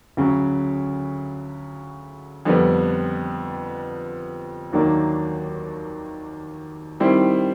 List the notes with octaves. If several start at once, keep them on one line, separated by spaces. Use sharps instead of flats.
D2 C#3 F#3
F2 D3 G3 B3
D#2 D#3 F#3 A#3 D4
D#3 G3 C4 E4